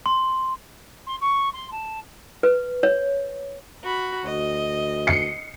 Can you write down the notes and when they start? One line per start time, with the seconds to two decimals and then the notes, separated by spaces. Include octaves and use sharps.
0.06 C6
1.06 C6
1.21 C#6
1.53 C6
1.71 A5
2.43 B4
2.83 C#5
3.83 F#4 B5
4.25 D2 D#5
5.07 C7 C#7